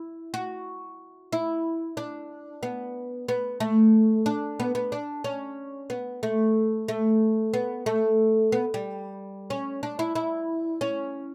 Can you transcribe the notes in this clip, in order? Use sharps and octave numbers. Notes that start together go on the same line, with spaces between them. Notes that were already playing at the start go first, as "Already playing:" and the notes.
Already playing: E4
F#4
E4
D4
B3
B3
A3
D4
B3
B3
D4
C#4
B3
A3
A3
B3
A3
B3
G3
C#4
D4
E4
E4
C#4